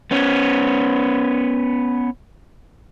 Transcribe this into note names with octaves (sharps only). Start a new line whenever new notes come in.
B3 C#4